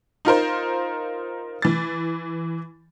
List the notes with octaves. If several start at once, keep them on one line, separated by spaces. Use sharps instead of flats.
D#4 F4 A#4 C5
E3 A6